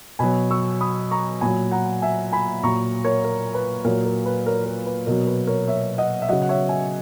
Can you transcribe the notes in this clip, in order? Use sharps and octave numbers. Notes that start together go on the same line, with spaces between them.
B2 F#3 G#5 B5
C#6 E6
B5 D#6
A#5 C#6
A#2 F#3 G#5 B5
F#5 A#5
E5 G#5
G#5 B5
A#2 F#3 A#5 C#6
A#4 C#5
A#4 C#5
B4
A#2 F#3 A#4 C#5
A#4
B4
A#4 C#5
A#4
B4
B2 F#3 A#4
B4
A#4 C#5
C#5 E5
D#5 F#5
E5
C#3 F#3 D#5 F#5
F#5
C#5 E5
E5 G#5